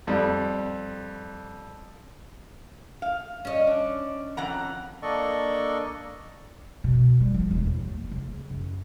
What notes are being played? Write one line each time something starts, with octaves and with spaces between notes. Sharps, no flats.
F2 G3
F5
C#4 D#5
D4
F2 F#5 A#5
A#3 D4 A4 D5 D#5 C#6
B2
G3
F3
E1
F#3
A#3
C#3
F#2